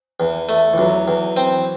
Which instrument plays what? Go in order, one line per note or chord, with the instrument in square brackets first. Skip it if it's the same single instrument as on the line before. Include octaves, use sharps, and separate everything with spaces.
[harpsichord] E2
A3
[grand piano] E3
[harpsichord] E2 [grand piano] F#3
[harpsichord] E2
C4